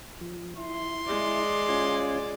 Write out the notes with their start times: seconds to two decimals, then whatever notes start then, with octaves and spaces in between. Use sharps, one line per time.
0.21 F3
0.57 E4 C6
1.06 G#3 D5
1.69 C#4 F4 G#5